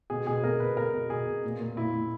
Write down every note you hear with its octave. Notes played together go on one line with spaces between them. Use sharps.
B2 G#4
B2 G#4
B2 A#4
B2 B4
B2 A#4
B2
B2 G#4
B2
A#2
A#2
A#2 E4
A#2